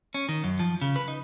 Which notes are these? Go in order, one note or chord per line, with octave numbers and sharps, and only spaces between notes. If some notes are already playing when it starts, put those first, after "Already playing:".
C#4
D#3
F#2
F3
C#3
B4
D#4